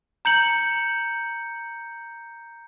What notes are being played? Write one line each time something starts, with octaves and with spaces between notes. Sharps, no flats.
A#5 G6 C#7 F#7